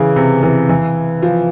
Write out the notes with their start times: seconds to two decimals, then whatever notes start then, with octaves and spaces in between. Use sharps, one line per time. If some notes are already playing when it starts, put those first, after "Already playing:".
Already playing: C#3 E3
0.16 C3
0.43 E3
0.69 E3
1.23 F3